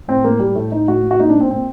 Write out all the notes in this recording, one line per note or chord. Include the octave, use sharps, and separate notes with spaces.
A2 C4
A2 A#3
A2 G3
A2 A3
A2 D#4
A2 F#4
A2
F#4
A#2 D#4
D4
A#2
C4
A#2 C4